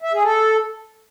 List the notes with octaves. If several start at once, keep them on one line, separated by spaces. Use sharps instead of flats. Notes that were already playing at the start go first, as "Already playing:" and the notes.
E5
G#4
A4